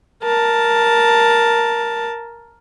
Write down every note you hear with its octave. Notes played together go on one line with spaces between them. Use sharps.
A#4 A5